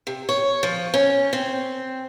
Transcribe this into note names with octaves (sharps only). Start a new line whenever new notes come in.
C3
C#5
F3
C#4
C4